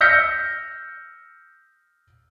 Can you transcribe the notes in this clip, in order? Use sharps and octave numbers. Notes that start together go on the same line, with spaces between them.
E6 F6 G6 A#6 B6 C#7